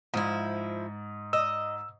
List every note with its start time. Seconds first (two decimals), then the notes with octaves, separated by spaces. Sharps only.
0.14 G#2 F3 E4
1.33 D#5 E6